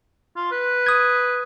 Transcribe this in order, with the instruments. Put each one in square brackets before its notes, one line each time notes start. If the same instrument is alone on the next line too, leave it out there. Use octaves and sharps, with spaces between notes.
[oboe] F4
B4
[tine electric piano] D#6 G#6